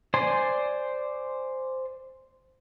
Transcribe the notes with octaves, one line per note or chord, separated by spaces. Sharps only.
C5 D5 G#5 C6